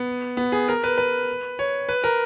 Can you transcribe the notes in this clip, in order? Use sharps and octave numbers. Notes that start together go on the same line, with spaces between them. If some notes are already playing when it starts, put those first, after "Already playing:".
Already playing: B3
B3
G#4
A#4
B4
B4
C#5
B4
A#4